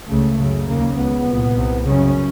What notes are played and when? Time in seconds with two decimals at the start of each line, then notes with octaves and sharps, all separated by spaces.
0.09 C#2 C#3 A3
0.38 F#2 C#3
0.68 D#2 C#3 A#3
0.97 C#2 C#3 B3
1.27 C2 A#2
1.56 C2 C3
1.86 F#2 C#3 C#4